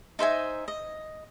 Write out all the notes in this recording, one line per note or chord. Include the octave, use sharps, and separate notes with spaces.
D#4 C5 E5 G#5
D#5